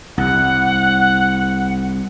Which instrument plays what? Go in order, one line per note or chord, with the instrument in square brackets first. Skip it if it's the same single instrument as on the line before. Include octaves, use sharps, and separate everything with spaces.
[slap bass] C2 [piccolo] F#5